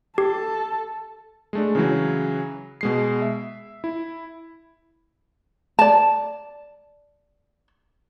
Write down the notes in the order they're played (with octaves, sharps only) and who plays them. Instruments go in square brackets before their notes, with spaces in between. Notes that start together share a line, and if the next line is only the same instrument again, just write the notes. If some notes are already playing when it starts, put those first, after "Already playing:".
[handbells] G4 [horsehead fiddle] A4
[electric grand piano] G#3 A3 D4
C#3 E3 F#3
B2 G#3 C7
E5
E4
[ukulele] D5 A5